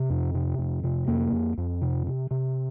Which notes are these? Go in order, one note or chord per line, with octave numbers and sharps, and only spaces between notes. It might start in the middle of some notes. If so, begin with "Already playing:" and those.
Already playing: C3
F2
C3
F2
C3
F2 A#3
F2
F2
C3
C3
C3